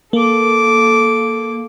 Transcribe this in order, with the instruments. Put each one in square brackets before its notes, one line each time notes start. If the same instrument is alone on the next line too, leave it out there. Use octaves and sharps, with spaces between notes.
[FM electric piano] A#3 [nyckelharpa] A4 D6